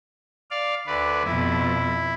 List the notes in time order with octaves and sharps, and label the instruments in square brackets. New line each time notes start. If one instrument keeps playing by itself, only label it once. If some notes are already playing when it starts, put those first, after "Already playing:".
[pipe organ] D5 F5
D2 B4 D5
[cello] F2 B2 [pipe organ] E4